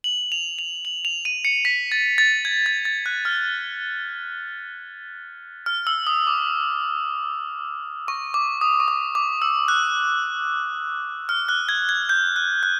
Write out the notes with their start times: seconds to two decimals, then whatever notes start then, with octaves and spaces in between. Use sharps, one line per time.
0.04 F#7
0.32 F7
0.59 F7
0.85 F#7
1.05 F7
1.25 D#7
1.45 C#7
1.65 B6
1.92 A6
2.18 A6
2.45 G#6
2.66 A6
2.85 A6
3.06 F#6
3.25 F6
5.66 F6
5.87 E6
6.07 D#6
6.27 D6
8.08 C#6
8.34 D6
8.61 D#6
8.80 C#6
8.88 D6
9.15 D6
9.42 E6
9.68 F#6
11.29 F6
11.49 F#6
11.69 G#6
11.89 G#6
12.09 G6
12.36 F#6
12.63 F#6